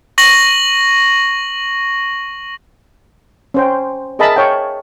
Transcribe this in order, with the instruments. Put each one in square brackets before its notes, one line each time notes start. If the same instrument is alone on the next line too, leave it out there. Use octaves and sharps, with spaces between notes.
[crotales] C#6 A#6 F#7
[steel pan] C#4 C5 G5
G#4 A#4 D#5 E5 A5 B5
C#5 F5 G5